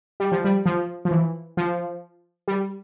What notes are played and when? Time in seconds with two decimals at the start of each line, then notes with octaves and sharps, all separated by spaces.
0.20 G3
0.32 F3
0.45 G3
0.66 F3
1.05 F3
1.11 E3
1.57 F3
2.48 G3